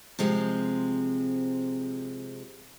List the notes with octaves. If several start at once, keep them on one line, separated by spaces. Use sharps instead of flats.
C3 F3 G#3 C4